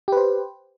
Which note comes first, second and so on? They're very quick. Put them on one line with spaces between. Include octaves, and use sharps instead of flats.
G4 B4 C5